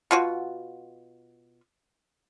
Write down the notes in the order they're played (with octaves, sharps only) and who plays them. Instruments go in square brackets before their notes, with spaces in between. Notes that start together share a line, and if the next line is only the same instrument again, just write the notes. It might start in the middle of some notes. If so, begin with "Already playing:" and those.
[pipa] B2 F4 F#4